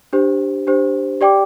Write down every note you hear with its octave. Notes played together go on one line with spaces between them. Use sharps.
D4 G4 C5
D4 G4 C5
G4 D5 G5 D6